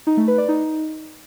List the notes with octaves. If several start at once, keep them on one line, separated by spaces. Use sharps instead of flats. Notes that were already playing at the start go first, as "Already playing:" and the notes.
D#4
A3
B4
D5
D#4